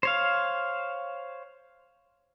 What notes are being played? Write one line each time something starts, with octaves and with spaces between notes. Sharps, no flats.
C5 C#5 F5